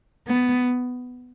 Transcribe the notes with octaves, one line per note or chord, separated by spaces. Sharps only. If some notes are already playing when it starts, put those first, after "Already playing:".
B3